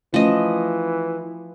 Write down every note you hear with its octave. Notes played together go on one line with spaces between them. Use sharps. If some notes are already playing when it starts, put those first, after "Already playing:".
E3 F3 A3 C#4 D#5